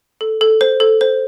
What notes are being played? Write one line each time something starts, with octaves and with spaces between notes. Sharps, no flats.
A4
A4
C5
A4
C5